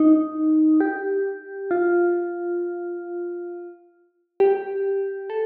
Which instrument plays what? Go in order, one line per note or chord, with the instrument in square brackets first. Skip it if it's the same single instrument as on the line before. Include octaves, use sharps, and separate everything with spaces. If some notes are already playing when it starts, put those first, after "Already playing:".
Already playing: [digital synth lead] D#4
G4
F4
G4
A4